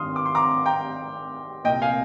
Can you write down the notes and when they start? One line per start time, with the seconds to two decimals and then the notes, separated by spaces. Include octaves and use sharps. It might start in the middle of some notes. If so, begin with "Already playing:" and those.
Already playing: G#1 G2 D#3 C6 D#6 F6
0.16 D6
0.26 C6
0.35 A#5 D6
0.65 G5 A#5
1.64 C2 A#2 D#5 G5
1.82 F5 G#5